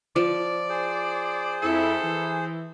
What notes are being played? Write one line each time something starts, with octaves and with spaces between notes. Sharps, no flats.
F3 D5
G#4 C5
F2 E4 A4
E3